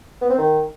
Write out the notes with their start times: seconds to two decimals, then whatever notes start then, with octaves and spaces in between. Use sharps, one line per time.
0.21 B3
0.29 C4
0.38 D#3